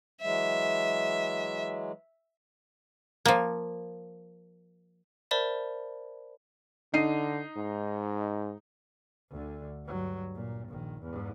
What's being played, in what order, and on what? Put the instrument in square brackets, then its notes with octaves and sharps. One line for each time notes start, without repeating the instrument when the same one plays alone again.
[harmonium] E3 F#3 G#3 [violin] E5
[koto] F3 A#3
[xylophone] A#4 C5 D5 E5 A5 B5
[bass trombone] D3 [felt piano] D#4 C7 D#7
[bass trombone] G#2
[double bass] D2 D3
G2 F#3
A#2
A#1 D#3
E2 G#2